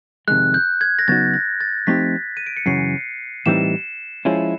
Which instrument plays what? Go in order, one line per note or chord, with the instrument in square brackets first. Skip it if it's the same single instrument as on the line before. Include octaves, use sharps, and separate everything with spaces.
[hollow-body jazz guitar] F2 C3 D#3 G#3 [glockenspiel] F#6
[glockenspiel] G6
G#6
A#6
[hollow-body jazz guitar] C#3 F#3 B3 D#4 F#4 [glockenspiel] A6
[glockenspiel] A#6
A6
[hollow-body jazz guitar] F3 A3 C4 D#4 G4 [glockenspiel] B6
[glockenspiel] D#7
D7
C#7
[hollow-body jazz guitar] F#2 C#3 E3 [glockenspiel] C7
[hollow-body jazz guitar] A2 E3 G3 C4 D#4 [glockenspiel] E7
[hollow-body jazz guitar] F3 G#3 C#4 E4